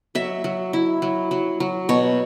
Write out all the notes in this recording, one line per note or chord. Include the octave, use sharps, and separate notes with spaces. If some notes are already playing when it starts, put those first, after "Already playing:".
F#3 E5
F#3
E4
F#3
F#3
F#3
B2 C#5